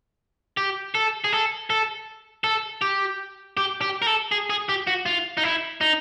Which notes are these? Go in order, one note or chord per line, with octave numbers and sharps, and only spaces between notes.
G4
A4
G#4
A4
A4
A4
G4
G4
G4
A#4
A4
G#4
G#4
G4
F#4
F4
D#4
E4
D#4